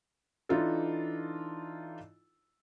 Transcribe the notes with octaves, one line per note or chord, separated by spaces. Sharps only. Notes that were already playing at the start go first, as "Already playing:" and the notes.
E3 D4 D#4 F4 A4